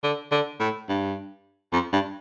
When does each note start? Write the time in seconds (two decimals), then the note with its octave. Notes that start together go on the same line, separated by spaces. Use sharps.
0.04 D3
0.32 D3
0.60 A2
0.89 G2
1.73 F2
1.93 G2